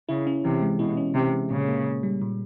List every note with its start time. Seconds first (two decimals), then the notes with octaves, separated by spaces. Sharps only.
0.09 C#3 E4
0.27 C#4
0.44 C3 E3
0.61 G#3
0.79 B2 E4
0.97 C#4
1.14 C3 E3
1.33 G#3
1.51 A#2 C#3
1.68 A#3
1.85 A#2
2.03 G3
2.22 A#2